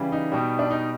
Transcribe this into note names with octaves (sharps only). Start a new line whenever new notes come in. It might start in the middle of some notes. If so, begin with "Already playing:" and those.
Already playing: C#3 E3 G3
D#4
B2 G3
D4
D#4